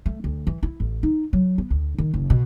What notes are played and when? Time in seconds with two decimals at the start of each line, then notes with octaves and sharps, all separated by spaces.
0.06 A3
0.24 D2
0.47 E3
0.63 E4
0.80 A1
1.03 D#4
1.33 F#3
1.58 B3
1.70 D2
1.98 D#3
2.14 F#1
2.30 B2